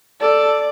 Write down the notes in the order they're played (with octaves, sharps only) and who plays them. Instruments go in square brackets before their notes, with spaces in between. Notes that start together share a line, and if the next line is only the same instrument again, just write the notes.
[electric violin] A4 [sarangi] D5